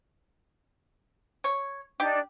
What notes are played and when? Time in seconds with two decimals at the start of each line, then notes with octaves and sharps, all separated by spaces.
1.44 C#5
2.00 D4 D#4 G4